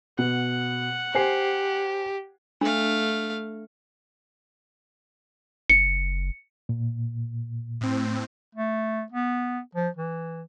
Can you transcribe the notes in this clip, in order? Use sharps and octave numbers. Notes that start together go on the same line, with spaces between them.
B2 F#5
G4 C5 G#5 C7
A3 D4 F5
F#1 C#7
A#2
A2 C4
A3
B3
F3
E3